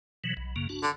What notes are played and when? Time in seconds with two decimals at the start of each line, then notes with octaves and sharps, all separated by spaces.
0.24 B2 E3 F#3
0.37 B1
0.56 F#2 C#3 A#3
0.69 D4 F#4
0.83 D3